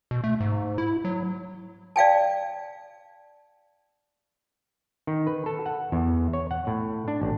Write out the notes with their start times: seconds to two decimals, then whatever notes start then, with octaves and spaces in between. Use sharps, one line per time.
0.11 B2
0.24 A3
0.40 G#2
0.78 E4
1.05 F#3
1.96 D5 F5 G5 A5
5.07 D#3
5.27 B4
5.46 A4
5.66 F#5
5.92 E2
6.33 C#5
6.51 F#5
6.67 A2
7.08 D4
7.22 A1